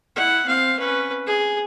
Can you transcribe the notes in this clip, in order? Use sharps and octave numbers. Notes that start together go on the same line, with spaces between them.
E4 F#5
C4 F5
C#4 B4
G#4